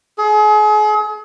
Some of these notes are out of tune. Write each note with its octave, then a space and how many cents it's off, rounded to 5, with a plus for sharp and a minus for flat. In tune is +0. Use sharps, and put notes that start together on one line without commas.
G#4 +35